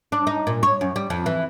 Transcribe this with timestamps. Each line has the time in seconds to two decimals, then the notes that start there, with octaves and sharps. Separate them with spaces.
0.12 D4
0.27 D#4
0.47 A#2
0.63 C#5
0.81 F#2
0.96 G3
1.10 F2
1.26 E3